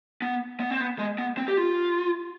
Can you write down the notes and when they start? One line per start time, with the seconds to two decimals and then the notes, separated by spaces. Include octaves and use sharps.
0.22 B3
0.60 B3
0.70 C4
0.81 B3
0.99 G#3
1.18 B3
1.37 C4
1.48 G4
1.57 F4